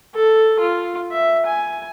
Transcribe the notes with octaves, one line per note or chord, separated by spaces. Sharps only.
A4
F4
E5
G#5